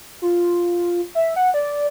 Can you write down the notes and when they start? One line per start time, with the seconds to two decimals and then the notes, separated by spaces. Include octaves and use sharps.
0.22 F4
1.15 E5
1.36 F#5
1.54 D5